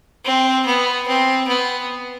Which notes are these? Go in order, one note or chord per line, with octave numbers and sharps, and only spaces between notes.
C4
B3
C4
B3